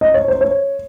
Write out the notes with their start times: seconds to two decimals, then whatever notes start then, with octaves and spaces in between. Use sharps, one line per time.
0.01 D#5
0.14 C#5
0.28 C5
0.41 C#5